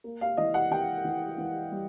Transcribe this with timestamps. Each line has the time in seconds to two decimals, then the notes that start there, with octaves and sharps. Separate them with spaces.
0.04 A#3
0.21 F5
0.37 E3 D#5
0.54 F#5
0.71 E3 G5
1.05 E3
1.38 E3
1.72 G3